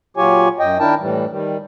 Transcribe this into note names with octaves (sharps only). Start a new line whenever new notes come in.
A#2 F#3 F4 G4 C#5 G#5
F#2 D#5 G5
D#3 D4 E4 A#4 G5 A5
A2 E3 G3
D#3 G3